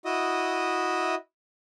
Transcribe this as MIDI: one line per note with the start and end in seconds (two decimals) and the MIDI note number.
0.05 1.15 64
0.05 1.15 66
0.05 1.15 75
0.05 1.15 76
0.05 1.15 87